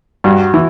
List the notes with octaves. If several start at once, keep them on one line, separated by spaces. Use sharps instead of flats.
G2 F#4
E3 E4